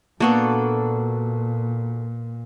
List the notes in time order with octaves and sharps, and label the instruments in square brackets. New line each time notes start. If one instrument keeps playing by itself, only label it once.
[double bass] A#2 [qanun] A#3 B3 [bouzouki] D4 F#4 A4